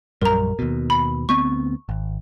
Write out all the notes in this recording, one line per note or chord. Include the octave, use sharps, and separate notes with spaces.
A#1 F#2 G3 A#4 A#5
D#2 B2
B5
D2 B3 C4 C#6
G#1